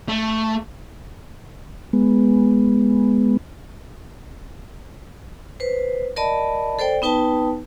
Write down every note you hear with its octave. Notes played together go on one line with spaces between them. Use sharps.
A3
G#3 B3
B4 C5
A#4 D5 D#5 A5 B5
A4 C5 D5 G5
B3 D#4 B4 G5 A5